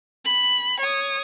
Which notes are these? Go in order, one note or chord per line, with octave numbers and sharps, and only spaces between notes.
B5
C#5 D#6